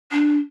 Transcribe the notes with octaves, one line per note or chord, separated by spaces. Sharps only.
D4